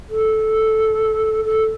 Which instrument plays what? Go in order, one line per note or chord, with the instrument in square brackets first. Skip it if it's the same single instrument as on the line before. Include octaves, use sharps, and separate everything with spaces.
[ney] A4
A4